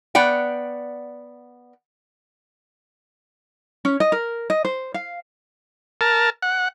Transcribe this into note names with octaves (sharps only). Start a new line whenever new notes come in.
B3 D5 F#5 G5
C#4
D#5
A#4
D#5
C5
F5
A#4 A5
F#5